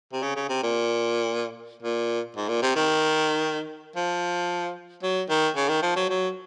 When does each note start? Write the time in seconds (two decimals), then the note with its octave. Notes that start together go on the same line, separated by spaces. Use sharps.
0.13 C3
0.23 C#3
0.36 C#3
0.49 C3
0.63 A#2
1.83 A#2
2.37 G#2
2.49 A#2
2.62 C3
2.76 D#3
3.96 F3
5.03 F#3
5.30 D#3
5.56 C#3
5.69 D#3
5.83 F3
5.96 F#3
6.10 F#3